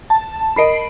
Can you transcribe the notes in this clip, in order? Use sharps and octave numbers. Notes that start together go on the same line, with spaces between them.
A5
A#4 D#5 B5 C7 D7